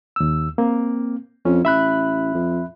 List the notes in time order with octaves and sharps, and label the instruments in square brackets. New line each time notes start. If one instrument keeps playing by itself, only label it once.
[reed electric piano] D#2 E6
A#3 C4
[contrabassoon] F2 [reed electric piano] C#4
[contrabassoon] A1 [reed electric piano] E5 B5 F#6
[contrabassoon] F2